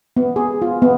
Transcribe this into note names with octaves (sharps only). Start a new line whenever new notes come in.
B3
G#4
F4
B3